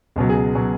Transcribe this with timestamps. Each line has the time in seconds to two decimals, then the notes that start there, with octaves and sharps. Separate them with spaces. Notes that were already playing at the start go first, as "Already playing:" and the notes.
0.16 C#2 B2 F#3
0.29 G#4
0.55 B2 F#3